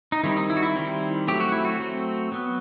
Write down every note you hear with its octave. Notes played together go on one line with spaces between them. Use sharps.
D#4
D#3 G3 C4 E4
D#4
E4
F#4
E4
D#3 G3 C4
F#3 A3 C4 G4
F#4
E4
F#4
F#3 A3 C4
F#3 B3